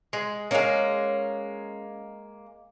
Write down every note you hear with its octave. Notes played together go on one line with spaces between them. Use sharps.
G#3
G#3 A#3 C#4 C#5